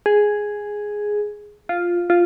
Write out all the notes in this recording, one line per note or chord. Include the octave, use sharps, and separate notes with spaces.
G#4
F4
F4